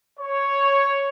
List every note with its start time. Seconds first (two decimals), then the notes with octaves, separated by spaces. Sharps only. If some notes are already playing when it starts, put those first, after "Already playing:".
0.19 C#5